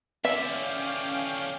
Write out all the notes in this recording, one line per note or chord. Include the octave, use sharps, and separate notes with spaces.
E2 D3 C#4 E5 F5 G5